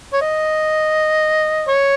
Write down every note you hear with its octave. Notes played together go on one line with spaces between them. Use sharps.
C#5
D#5
C#5